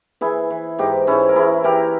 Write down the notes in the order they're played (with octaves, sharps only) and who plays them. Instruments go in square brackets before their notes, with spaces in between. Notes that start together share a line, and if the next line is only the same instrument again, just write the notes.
[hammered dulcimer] E3 E4 G#4
E3
G#2 D#4 G4
G#2 C#4 E4
A#4
E3 E4 G#4
E3 G4 A#4